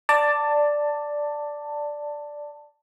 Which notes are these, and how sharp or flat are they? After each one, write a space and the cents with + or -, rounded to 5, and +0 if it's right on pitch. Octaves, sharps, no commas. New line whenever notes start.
D5 +0 A5 +15